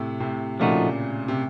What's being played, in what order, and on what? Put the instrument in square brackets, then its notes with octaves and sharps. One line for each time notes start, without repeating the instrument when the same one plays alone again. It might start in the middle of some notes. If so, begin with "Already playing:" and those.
Already playing: [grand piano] A2 C3
A2 C3
[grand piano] A#2 C#3 [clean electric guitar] F3 A3 D#4 F#4
[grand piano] C3